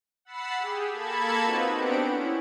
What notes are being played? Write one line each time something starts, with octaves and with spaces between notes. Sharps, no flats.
F#5 B5 E6 A6 C7
G4 G#4
A#3 A4 A5 B5 G#6
C4 D#4 F4 F#4 B4
B3 C4 D4 G4 F#5 D7
C#4 E4